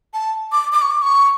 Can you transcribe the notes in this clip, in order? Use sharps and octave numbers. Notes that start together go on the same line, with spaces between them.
A5
D6
D6
C#6
D6
C#6